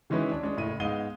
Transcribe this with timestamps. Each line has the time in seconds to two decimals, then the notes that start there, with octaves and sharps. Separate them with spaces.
0.10 D#3 E3 G#3 C#4 E4 B4
0.32 D4
0.43 G#3 C#4 D4
0.57 F#1 A2 D#7
0.80 G#2 G#3 B3 F5 D#7 G7